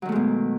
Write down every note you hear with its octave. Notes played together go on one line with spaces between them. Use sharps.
B2 D#3 F#3 G#3 A3